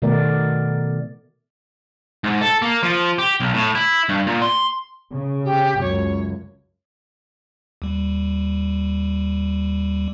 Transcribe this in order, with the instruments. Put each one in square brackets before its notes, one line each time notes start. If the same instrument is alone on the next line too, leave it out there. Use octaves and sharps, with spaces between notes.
[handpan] B2 D#3 A3 B3 A#4 D5
[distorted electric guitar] G#2
A4
A#3
F3
G4
B1
A2
E4
G2
A#2
C6
[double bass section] C#3
[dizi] G4
[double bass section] C#2 F#2 [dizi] C#5
[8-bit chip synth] D#2 G3